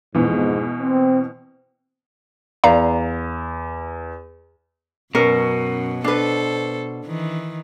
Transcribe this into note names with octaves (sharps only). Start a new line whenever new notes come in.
F2 G#2 B2 E3
C4
E2 D5 F5 A#5
F#2 B2 F#3 C#4 A#4
D4 A4 B4 C5
D#3 E3